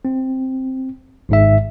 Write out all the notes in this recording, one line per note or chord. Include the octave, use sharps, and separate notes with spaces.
C4
G#1 G#2 E5